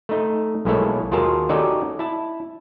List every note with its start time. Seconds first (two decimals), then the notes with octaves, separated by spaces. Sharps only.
0.09 A3 D#4
0.65 B1 G#3 A#3 E4 A4 C#5
1.11 D#2 F4 F#4 G#4 A#4 A5
1.49 C#4 D#4 F#4 G4 A4 D5
1.99 E4 A5